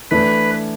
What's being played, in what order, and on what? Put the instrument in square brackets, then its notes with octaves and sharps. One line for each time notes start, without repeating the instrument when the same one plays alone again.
[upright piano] E3 A3 D4 [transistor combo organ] B4